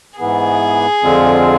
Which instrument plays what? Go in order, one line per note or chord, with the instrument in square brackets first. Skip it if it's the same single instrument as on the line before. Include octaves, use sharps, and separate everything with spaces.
[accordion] G#2 E3 B3 [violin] G#4
[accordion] F2 D3 G#3 C4 F4